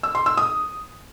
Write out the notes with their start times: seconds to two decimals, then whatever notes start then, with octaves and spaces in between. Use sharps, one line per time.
0.03 E6
0.15 C6
0.26 E6
0.37 D#6